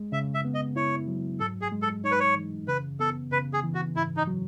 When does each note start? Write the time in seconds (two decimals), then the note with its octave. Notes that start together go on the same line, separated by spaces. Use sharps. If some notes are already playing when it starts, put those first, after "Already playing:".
Already playing: G#3
0.12 C#3 E5
0.34 E5
0.45 B3
0.54 D#5
0.76 E4 C#5
1.08 F#3
1.40 G#2 A4
1.61 G#4
1.72 G#3
1.82 A4
2.04 D#4 C#5
2.12 B4
2.20 C#5
2.35 E3
2.68 C#3 B4
3.00 B3 A4
3.32 C#3 B4
3.53 G#4
3.64 E3
3.75 F#4
3.95 G#2 E4
4.17 D#4
4.27 F#3